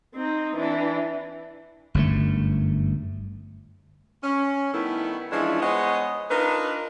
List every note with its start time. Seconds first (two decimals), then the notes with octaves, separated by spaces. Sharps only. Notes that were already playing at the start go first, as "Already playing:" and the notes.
0.15 C4 D#4
0.56 E3 D4
1.94 G1 F#2 C3 A3
4.24 C#4
4.74 D#3 G3 A3 B3 E4
5.32 E3 F3 G#3 C#4 D4 E4
5.62 G#3 B3 C5 C#5 D#5
6.30 D4 D#4 F4 A#4 B4